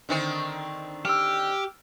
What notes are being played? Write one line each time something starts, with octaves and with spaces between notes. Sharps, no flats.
D3 D#3 C4
G4 E6 F6